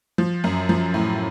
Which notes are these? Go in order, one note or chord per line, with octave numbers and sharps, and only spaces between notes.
F3
F#2
F3
A2